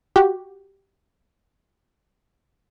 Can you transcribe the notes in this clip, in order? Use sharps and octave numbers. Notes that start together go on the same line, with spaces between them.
F#4 G4